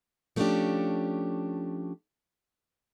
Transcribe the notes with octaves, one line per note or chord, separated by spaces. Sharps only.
F3 A3 B3 C#4 D4 G4